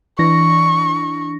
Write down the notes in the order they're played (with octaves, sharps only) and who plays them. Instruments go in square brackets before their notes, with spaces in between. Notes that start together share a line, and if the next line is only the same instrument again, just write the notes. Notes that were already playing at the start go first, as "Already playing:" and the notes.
[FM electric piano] E3 D4 A#6 [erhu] C#6